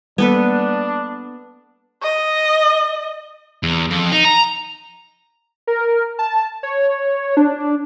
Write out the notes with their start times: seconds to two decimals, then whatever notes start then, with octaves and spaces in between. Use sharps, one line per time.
0.18 G3 A#3 B3 D4 A4 B4
2.02 D#5
3.63 E2
3.90 F2
4.12 D#4
4.24 A#5
5.67 A#4
6.19 A5
6.63 C#5
7.37 D4